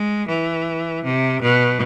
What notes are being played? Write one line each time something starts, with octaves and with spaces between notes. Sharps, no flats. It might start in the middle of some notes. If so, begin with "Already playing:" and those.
Already playing: G#3
E3
C3
B2